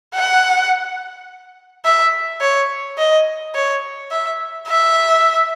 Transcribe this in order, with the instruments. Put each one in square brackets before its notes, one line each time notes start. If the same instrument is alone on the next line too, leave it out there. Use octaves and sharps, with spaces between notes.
[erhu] F#5
E5
C#5
D#5
C#5
E5
E5